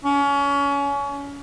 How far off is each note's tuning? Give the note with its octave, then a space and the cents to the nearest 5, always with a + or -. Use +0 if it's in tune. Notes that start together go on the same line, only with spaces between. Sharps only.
C#4 +30